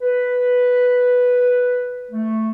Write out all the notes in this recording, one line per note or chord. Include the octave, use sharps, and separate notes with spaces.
B4
A3